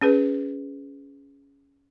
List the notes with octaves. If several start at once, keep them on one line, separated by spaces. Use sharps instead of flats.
C#4 G#4 B4